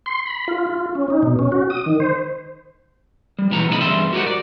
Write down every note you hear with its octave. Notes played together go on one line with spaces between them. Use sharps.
C6
B5
F4
F4
C#4
D#4
B2
C#4
F#4
D#6
D#3
C5
G3
B1 E3 B3 A#5
D2 C#3 C4 E4 D#5 B5
E2 G2 G3 G#3 E5 C6
F#4 G4 A#4 C5 D#5 F#5
D5